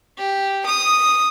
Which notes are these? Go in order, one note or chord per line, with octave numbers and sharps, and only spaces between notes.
G4
D#6